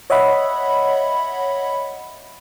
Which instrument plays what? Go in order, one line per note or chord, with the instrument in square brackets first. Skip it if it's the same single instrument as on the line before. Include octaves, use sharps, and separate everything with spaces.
[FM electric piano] C#5 D#5 E5 F#5 B5